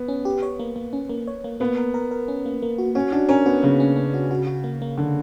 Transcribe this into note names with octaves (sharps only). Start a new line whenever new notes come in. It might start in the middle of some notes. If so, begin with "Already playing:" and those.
Already playing: B3
C#4
G4
C#5
A#3
A#3
C#4
A#3
C#5
A#3
A#3 B3
A#4
A#4
A#4
C#4
A#3
A#3
F#4
C#4 F#4
D4 F#4
C#4 A#4
B3 F#4
C#3 A#3
C#4
C#4
F#4
F#4
F#4
A#3
A#3
D3 A#3